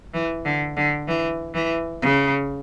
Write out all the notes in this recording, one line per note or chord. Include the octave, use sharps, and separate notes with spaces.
E3
D3
D3
E3
E3
C#3